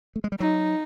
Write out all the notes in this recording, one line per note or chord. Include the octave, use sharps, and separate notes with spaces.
A3
G#3
G3
F#3 D#4